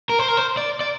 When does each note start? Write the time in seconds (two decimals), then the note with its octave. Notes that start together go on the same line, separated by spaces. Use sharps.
0.09 A#4
0.19 C5
0.28 A#4
0.37 C5
0.57 D5
0.81 D5